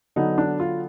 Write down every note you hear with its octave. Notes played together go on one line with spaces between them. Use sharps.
D3 F#3 B3 D#4
D4
F4